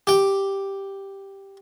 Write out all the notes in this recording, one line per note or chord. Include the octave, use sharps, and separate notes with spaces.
G4 G5